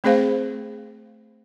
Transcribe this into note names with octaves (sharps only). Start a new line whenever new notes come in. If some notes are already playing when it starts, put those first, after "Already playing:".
A3 C4 G#4 C5 F5